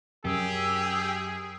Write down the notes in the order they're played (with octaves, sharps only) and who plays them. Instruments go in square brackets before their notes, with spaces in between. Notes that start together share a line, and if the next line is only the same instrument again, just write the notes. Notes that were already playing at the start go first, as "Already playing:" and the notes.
[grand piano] F#2 [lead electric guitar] G4 [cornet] G#4 [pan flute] E6